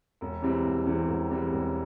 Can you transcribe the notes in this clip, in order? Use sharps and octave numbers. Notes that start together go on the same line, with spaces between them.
E1
E2 E3 G3 C4
E1
E2 E3 G3 C4
E1
E2 E3 G3 C4
E1